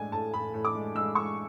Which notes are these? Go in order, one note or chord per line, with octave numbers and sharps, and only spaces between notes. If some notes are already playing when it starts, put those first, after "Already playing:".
Already playing: A2 G#3 D4 D5 G#5
A2 A5
A2 B5
A2
D6
G#3
G#3 E6
G#3 C#6